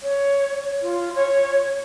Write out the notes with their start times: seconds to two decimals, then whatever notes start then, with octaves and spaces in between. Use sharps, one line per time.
0.03 C#5
0.82 F4
1.15 C#5